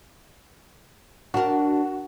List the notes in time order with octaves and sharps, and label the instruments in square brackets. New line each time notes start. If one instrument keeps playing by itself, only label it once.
[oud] D4 A#4 [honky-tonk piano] F#4